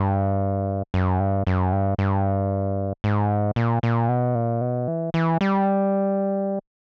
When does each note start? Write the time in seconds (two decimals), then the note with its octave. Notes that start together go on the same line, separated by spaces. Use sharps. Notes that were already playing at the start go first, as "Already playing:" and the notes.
Already playing: G2
0.94 F#2
1.20 G2
1.47 F#2
1.72 G2
1.98 G2
3.04 G#2
3.56 A#2
3.83 A#2
4.09 B2
4.35 A#2
4.61 B2
4.88 E3
5.14 E3
5.41 G3